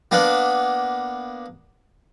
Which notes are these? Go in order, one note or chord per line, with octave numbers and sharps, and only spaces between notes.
A#3 B3 D4